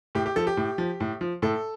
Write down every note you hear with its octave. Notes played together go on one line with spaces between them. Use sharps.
A2 G4
G4
F3 A4
G4
A2
F3
A2
F3
A2 A4